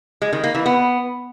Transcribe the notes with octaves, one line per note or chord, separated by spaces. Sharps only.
G#3
D#3
A#3
E3
B3